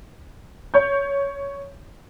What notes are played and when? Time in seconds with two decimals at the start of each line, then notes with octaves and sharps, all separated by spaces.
0.74 C#5 G6